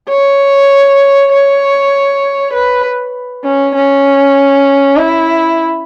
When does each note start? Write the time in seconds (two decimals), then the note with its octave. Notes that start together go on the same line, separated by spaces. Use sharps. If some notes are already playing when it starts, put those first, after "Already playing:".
0.09 C#5
1.31 C#5
2.53 B4
3.44 C#4
3.75 C#4
4.97 E4